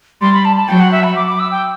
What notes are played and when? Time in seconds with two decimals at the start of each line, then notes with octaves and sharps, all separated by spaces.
0.21 G3 C6
0.33 B5
0.45 A5
0.56 A5
0.68 F#3 G5
0.80 F#5
0.92 E5
1.03 B5
1.16 D6
1.27 D6
1.39 E6
1.51 G5